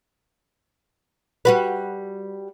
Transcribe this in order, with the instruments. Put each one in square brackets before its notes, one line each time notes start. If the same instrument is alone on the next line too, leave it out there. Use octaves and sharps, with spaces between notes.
[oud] G3 F#4 B4